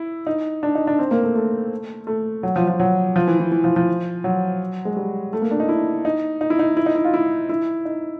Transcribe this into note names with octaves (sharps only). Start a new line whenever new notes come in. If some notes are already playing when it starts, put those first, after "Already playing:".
Already playing: E4
D#4
D4
D#4
D4
C4
A#3
A3
A3
A3
F#3
F3
F3
F#3
F3
E3
E3
E3
F3
F3
F#3
G#3
G3
A3
A#3
D4
D#4
E4
D#4
D#4
E4
D#4
E4
D#4
E4
F4
E4
E4
D#4